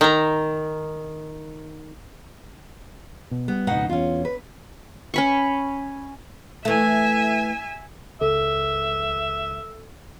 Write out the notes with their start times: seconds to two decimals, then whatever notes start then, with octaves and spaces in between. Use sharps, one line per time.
0.01 D#3 A#5
3.31 B2
3.48 G3 B3
3.67 F1 C#2 G#2 B2 D#4 F#5
3.89 E2 C#4 F4
4.25 B4
5.14 C#4 B5 C#6
6.65 E3 A3 E5 G#5
8.21 C#2 A4 E5